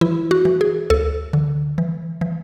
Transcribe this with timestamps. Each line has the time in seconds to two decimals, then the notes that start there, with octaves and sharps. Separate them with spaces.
0.01 E3 E4
0.31 F#4
0.45 E3
0.61 G#4
0.90 D2 A4
1.33 D3
1.78 E3
2.21 E3